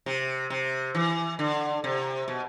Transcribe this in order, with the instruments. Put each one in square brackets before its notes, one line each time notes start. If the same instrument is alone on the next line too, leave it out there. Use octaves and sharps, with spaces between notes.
[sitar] C3
C3
E3
D3
C3
B2